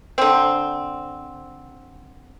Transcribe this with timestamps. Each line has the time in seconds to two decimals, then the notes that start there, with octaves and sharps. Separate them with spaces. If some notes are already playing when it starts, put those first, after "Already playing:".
0.18 D3 C4